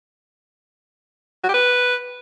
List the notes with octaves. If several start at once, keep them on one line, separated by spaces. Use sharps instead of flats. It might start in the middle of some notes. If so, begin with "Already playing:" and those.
F#4
G4
B4